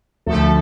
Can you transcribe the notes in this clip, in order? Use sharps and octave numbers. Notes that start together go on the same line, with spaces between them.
D2 D3 F3 A3 A4